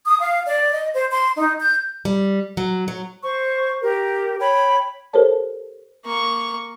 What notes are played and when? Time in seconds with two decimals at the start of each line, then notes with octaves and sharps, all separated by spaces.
0.06 D#6
0.20 F5
0.47 D5
0.72 D#5
0.93 C5
1.11 C6
1.37 D#4
1.60 G6
2.05 G3
2.57 F#3
2.88 F#3
3.23 C5 C#6
3.82 G4 A#4
4.39 C#5 G5 B5
5.13 G4 A4 A#4 C5 C#5 A5
6.05 A#3 C#6